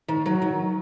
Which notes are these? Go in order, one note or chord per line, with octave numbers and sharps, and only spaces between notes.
D#3
F#3
D#3